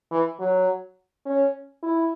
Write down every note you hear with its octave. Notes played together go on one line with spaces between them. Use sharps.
E3
F#3
C#4
E4